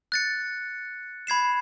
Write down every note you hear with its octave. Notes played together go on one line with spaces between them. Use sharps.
F#6 A6 C#7
B5 G#6 C7 E7